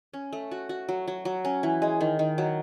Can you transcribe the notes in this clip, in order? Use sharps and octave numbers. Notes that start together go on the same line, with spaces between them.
C#4
A3
F#4
F#4
F#3
F#3
F#3
C#4
E3
G#3
D#3
D#3
F#3